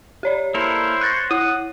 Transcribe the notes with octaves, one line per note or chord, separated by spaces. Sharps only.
G4 C#5 D5
A#3 E4 A4 A#4 C5
C#5 F#6 A6 A#6
E4 F#5 D#6